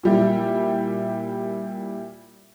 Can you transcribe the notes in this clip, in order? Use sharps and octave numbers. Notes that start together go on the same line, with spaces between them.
A#2 G3 E4